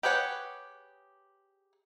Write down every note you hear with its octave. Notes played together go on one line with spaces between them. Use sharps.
G4 G#4 B4 C#5 F#5